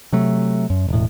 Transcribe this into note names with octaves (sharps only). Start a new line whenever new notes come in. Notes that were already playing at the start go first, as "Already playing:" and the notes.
C3 F#3 A3
F#2
E1 A2